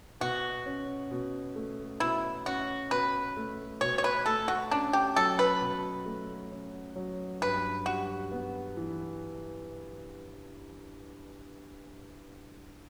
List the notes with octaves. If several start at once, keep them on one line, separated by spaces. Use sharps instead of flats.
B2 F#4
C#4
B2
A3
B2 E4
C#4 F#4
B2 B4
A3
B2 C#5
C#5
B4
A3 A4
F#4
C#4 D4
G4
F#3 A4
B4
B2
A3
C#4
F#3
G2 B4
G3 F#4
B3
E3